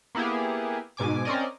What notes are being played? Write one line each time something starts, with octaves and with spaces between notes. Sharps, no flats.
A#3 B3 E4 G4 G#4
G#2 B2 G#5 D6
C4 C#4 A#4 D5 D#5